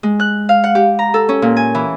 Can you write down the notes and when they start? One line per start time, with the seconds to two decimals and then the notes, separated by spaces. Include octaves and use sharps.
0.03 G#3
0.20 F#6
0.49 F5
0.64 F#5
0.75 G4
0.99 A#5
1.14 A4
1.29 C#4
1.42 A#2
1.57 G#5
1.75 E3